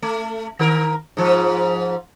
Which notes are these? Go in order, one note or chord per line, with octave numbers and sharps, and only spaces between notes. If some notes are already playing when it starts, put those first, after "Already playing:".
A3
D#3 A#4
G#2 F3